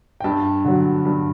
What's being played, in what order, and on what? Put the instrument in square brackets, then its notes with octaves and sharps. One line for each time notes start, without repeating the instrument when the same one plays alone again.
[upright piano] G5
G2 A5
D3 F#3
G2